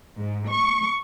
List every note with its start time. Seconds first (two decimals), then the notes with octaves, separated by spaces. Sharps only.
0.18 G#2
0.50 C#6